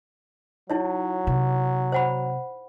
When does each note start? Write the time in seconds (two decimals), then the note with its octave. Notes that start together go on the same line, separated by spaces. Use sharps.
0.70 F#3 D#4 E4 C#5
1.27 C3
1.92 C5 F#5 B5